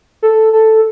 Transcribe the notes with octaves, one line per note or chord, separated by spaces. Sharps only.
A4
A4